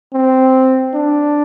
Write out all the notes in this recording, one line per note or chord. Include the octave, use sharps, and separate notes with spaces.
C4
D4